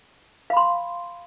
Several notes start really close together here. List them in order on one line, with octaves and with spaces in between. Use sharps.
F5 B5 C6